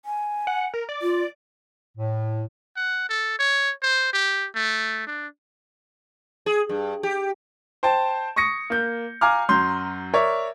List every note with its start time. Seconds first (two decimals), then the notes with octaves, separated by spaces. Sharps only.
0.05 G#5
0.47 F#5
0.74 A#4
0.89 D5
1.02 F4
1.98 A2
2.77 F#5
3.09 A4
3.39 C#5
3.83 C5
4.13 G4
4.55 A3
5.07 D4
6.46 G#4
6.69 G2
7.03 G4
7.83 C5 G5 A5
8.36 C#6 D#6 A#6 C#7
8.70 A#3 G6
9.21 F5 G#5 A#5 D6 F6
9.49 F#2 F#3 C6 G6
10.13 A#4 C#5 D5 E5